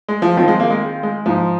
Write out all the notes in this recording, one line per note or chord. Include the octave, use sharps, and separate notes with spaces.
G#3
F3
D#3 F3 C4 F4
G#3
A#3
G#3
G#3
G#2 F3 G#3 D#4